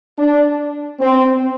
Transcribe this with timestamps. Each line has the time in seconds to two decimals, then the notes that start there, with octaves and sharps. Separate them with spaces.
0.17 D4
1.00 C4